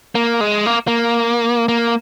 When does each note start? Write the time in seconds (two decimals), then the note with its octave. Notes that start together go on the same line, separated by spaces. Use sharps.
0.15 A#3
0.41 G#3
0.66 A#3
0.88 A#3
1.69 A#3